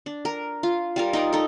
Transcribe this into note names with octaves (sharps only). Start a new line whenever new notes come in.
D4
A#4
F4
G3 F4 A#4
D#4 A#4 D5
D#4 A4